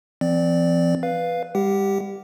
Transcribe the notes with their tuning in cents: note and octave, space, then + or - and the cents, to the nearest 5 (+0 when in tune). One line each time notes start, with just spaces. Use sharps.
F3 -45 C4 -20 D5 +5
B4 +0 F5 +0
G3 +35 G4 +0 F#5 +35